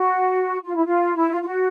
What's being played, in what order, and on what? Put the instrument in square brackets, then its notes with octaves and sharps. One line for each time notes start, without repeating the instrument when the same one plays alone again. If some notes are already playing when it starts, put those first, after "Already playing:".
Already playing: [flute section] F#4
F4
E4
F4
E4
F4
F4
F#4